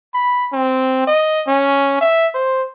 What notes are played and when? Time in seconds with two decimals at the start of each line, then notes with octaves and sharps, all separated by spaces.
0.14 B5
0.53 C4
1.07 D#5
1.48 C#4
2.01 E5
2.34 C5